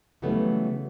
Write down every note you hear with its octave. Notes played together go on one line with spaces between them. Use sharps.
C#3 E3 F#3 G3 A3 B3